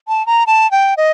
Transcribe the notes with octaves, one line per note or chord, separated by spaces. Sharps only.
A5
A#5
A5
G5
D#5